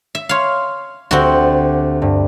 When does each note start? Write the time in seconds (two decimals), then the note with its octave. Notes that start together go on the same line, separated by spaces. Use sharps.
0.15 E5
0.29 C#5 F5 C6 F6
1.11 D2 C4 F#4 G4 F#5
2.02 G2